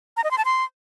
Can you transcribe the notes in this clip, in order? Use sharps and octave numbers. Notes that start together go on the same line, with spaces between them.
A#5
D#5
C6
A5
C6